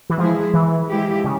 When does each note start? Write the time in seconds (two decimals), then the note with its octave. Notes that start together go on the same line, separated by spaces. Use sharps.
0.10 E3
0.18 F3 G#3 E4 G#4
0.54 E3
0.89 F3 G#3 E4 G4
1.24 C#3